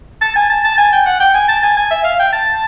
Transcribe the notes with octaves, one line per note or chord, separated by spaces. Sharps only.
A5
G#5
A5
A5
G#5
G5
F#5
G5
G#5
A5
G#5
G#5
E5
F5
G5
A5